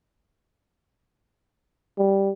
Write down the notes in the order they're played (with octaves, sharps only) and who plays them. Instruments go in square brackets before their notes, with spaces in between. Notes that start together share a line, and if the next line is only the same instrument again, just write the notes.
[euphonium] G3